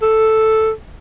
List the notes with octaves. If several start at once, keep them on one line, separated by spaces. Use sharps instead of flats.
A4